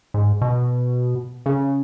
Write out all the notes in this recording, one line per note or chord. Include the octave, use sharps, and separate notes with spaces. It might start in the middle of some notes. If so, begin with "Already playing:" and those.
G#2
B2
C#3